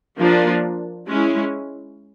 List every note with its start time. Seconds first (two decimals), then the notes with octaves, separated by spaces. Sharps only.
0.19 F3 A#3 D4 F4
1.07 G#3 C#4 E4